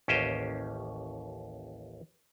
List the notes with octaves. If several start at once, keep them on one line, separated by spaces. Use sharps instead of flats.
A1 D#2 C#4 G4 C5 D#5